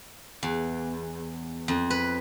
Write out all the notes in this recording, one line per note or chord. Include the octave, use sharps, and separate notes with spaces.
E2
F2
B4